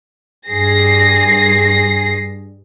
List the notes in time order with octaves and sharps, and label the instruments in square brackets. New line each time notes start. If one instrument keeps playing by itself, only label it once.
[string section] G2 G#4 A#6 C7